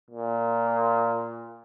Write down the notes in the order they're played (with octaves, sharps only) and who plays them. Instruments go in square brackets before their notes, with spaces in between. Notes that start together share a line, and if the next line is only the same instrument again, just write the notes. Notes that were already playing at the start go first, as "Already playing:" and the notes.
[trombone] A#2